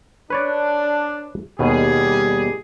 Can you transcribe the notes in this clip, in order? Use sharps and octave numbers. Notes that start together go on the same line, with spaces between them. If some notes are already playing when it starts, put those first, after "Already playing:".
D4 B4 C#5 D5
D#2 B2 G3 G4 G#4